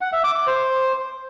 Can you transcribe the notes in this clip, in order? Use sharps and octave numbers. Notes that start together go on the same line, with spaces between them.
F#5
E5
D6
D6
C5